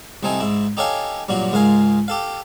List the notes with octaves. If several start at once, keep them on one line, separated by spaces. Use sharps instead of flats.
C2 A3 C4 D#4 G#5 D#6
G#2 E4
D#4 G4 A4 C#5 F5 G#5
G2 A#2 F#3 F#4
C#2 G#2 A#4 F5 G#5
G4 A4 F5